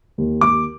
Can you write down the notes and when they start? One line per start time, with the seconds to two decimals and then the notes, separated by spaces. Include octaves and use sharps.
0.18 D#2
0.41 D#2 D6